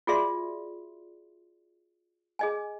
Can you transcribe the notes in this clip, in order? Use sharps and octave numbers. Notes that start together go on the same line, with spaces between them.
F4 F#4 G#4 D5 E5 C6
G#4 D#5 G#5